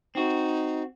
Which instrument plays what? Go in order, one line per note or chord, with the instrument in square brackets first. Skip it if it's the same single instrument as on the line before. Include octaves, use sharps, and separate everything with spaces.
[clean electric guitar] C4 F#4 [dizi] D#4